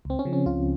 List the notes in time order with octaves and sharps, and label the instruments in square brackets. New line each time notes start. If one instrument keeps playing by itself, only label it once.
[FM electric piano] C#2 C4
C#4
C#3 F3
C#4
C#2 F4